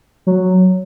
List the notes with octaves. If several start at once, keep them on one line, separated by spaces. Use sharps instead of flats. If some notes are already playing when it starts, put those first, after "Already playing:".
F#3